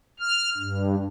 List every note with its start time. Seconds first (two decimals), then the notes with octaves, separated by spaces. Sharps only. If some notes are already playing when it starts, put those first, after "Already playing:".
0.20 F6
0.57 G2